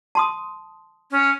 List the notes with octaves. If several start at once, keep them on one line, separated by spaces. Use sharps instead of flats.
A5 C6 D#6
C#4